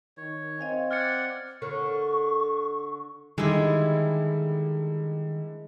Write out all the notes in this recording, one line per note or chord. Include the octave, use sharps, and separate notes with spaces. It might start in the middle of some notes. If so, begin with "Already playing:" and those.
D#3 C#5
C4 D#5 F5 G#5
D5 F#5 F6 G#6 C#7
D3 A#4 C#5 C#6
D3 D#3 G3 G#3 E4